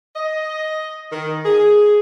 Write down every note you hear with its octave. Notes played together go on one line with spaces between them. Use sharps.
D#5
D#3
G#4